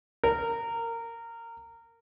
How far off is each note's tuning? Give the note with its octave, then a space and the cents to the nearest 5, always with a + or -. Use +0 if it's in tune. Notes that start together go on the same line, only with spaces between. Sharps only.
A#4 -20